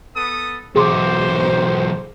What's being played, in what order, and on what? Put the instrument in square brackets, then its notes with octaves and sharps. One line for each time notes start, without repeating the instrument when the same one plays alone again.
[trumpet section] B3 A4 D#6
[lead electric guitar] B1 E2 [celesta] G#4 C6 D6 [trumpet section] C5